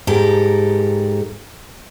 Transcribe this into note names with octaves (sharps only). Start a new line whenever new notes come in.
G#2 G4 A4 A#4